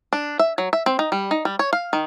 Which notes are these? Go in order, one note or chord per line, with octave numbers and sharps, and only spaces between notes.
D4
E5
F#3
E5
C4
D#4
G3
D#4
G3
C#5
F5
D#3